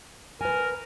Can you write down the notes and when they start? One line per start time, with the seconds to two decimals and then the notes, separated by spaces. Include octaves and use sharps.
0.41 A#4 B4 G#5